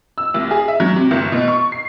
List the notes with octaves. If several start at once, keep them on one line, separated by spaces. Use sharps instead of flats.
E6
C2
G#4
E5
F#3
C3
G1
B2
C#6
C7